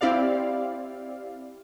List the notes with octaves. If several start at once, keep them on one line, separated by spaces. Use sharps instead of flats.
C4 E4 G4 D5 F5